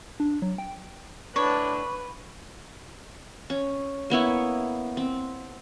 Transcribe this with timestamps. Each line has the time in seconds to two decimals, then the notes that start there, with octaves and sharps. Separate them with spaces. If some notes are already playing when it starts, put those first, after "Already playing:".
0.20 D4
0.42 F#3
0.58 G5
1.36 A2 D4 B4 C#5
3.50 C#4
4.10 A#3 B3 E4 C#5
4.97 C4